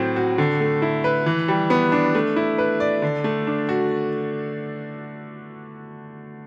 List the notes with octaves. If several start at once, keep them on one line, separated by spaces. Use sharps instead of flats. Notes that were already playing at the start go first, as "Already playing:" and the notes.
Already playing: A2 F#3 C4
F#4
D3
A3
E4
B4
E3
G3
B3
D4
A3
E4
B4
D5
D3
A3
D4
F#4